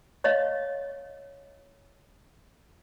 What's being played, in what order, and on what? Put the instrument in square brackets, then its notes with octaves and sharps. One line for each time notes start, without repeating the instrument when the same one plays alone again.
[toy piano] C#5 D#5 F5